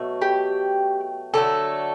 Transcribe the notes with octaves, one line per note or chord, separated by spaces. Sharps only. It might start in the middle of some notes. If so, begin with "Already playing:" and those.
Already playing: B2 F#3 A3
G4
D3 F#3 A3 A4